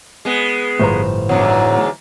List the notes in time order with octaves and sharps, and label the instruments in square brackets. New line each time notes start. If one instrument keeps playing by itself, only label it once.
[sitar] G#3 B3
[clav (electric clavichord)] G1 F3 B4 [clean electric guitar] A2 C5 A#5
[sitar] E2 G#2 D3 [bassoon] F#3